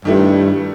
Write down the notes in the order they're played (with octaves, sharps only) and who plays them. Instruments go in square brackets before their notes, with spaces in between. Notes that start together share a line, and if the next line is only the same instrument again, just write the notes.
[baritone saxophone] G2 [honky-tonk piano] D#3 A3 E4